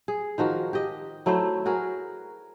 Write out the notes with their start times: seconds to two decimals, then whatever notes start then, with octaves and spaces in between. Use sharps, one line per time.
0.08 G#4
0.38 D#3 F3 F#4 A#4
0.73 G4 D#5
1.26 F#3 A3 E4 C5
1.66 F#4 G#4 A#4